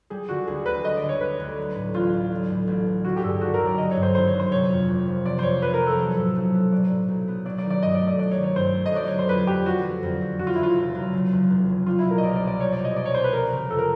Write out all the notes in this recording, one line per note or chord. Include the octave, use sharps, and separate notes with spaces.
G3 G#4
D3 F#4
D2 G#4
D2 B4
G3 D#5
D5
D3
C#5
D2 B4
D2
F#3
A2
A1 F4
A1
F#3
A2
A1
A1
D3 F#4
G4
G2 A4
G#4
G#1 F#4
A#4
F#3
D5
D3 D#5
C#5
G2
C5
G#1 C5
C#5
F#3
C5
C3 C#5
F2
F1
F3
C3 D5
C5
F2 C#5
F1 B4
A#4
F3
A4
F#3
A2
B1
B3
F#3 D5
A2
B1
B3
F#3 D5
D5
D#3
D5
G2 D#5
D5
A3
D5
F#3 D5
C#5
D#3
C#5
G2 C5
A3
D#5
F#3 D5
D3 C#5
C5
F2 B4
F2 G4
F#3 F#4
D3
F2
F2
C#3 F#4
F4
E2 E4
F4
F1
F#3
C#3
E2
F1
F#3
G3 F4
E4
B2
A#4
D#5
C2 D5
D5
C4
D5
G3 C#5
D5
B2
D#5
C2 D5
C#5
C4 C5
B4
F3 A#4
C#3
F2 A4
A#4